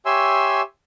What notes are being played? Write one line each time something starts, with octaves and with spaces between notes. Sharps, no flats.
G4 C#5 E5 G#5 C6 E6